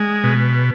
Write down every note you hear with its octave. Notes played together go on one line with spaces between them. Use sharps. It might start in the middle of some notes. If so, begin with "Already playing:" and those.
Already playing: G#3
B2